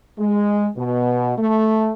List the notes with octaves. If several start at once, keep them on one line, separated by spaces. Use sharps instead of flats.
G#3
B2
A3